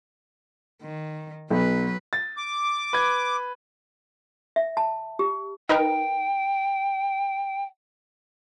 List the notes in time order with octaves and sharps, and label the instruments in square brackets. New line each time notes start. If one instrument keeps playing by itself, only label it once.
[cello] D#3
[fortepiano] B1 [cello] F#3 B4
[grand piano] A6
[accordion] D6
[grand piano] B4 G#6
[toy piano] E5
A5
G4
[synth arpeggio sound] D#4 A#4 B4 [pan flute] G5